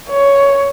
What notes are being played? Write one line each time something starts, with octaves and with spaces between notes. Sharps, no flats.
C#5